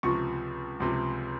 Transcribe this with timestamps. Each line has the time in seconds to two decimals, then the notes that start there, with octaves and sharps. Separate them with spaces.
0.03 C#2 C3 F3 C#6
0.80 C#2 C3 F3